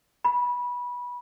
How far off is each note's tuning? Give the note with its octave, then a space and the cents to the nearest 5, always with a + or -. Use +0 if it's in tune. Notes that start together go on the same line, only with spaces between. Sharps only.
B5 -20